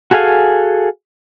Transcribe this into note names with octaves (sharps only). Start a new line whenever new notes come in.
F#4 G#4 A4 F5 G#5